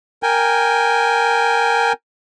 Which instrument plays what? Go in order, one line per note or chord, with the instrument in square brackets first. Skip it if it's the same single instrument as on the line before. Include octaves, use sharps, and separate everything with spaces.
[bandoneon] A#4 G5 G#5